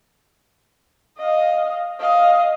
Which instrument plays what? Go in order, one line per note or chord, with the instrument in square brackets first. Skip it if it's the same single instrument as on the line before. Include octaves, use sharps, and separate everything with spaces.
[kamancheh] D#5 F5
D#5 F5